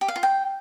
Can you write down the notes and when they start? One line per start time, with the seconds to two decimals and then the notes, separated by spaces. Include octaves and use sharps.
0.01 G4
0.08 F5
0.16 F4
0.23 G5